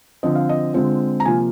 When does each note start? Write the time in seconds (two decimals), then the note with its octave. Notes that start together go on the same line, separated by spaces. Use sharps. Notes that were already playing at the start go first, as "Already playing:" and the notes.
0.23 D3 F3 C4 D#5
0.35 F5
0.49 D#5
0.74 D3 G#3 C4 F4
1.20 A#5
1.25 C3 F3 A#3 F4 G#5